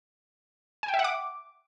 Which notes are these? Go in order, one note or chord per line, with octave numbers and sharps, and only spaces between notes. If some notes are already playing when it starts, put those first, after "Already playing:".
G#5
G5
E5
F#5
D6